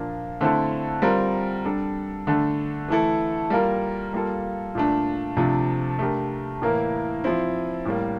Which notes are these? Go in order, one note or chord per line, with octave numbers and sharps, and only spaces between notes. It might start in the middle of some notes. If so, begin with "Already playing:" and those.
Already playing: A#2 F3 A#3 D4
D3 A3 C4 E4 A4
G3 C4 F4 A#4
G3 D4 A4
D3 A3 D4 A4
E3 A3 E4 A4
G3 A#3 F4 A#4
G3 A#3 F4 A4
A#2 A3 D4
C3 F3 A3 D4
A3 D4 G4 A#4
A2 E3 A#3 E4 A#4
F3 C4 E4
A2 G3 A#3